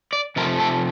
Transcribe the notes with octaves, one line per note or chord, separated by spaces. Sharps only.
D5
C3 F3 A3 A#4
A4